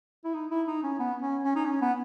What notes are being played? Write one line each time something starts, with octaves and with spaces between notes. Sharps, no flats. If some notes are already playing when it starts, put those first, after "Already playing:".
E4
D#4
E4
D#4
C#4
B3
C#4
C#4
D#4
C#4
B3